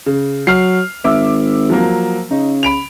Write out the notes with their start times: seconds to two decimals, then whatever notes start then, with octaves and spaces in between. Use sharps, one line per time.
0.06 C#3
0.47 F#3 F6 C7
1.04 G#1 E5 D6 E6
1.70 F3 F#3 A#3
2.31 C#3 D#4
2.63 B5 D7 F7